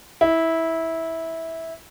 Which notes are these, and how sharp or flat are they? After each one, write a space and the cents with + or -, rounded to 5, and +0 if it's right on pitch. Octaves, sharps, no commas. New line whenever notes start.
E4 -15